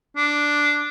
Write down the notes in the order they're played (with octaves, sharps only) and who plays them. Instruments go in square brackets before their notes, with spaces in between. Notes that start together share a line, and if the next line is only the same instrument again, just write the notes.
[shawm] D4